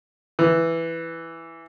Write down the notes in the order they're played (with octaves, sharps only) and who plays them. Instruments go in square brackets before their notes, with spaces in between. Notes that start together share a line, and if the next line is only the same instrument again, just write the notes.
[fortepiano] E3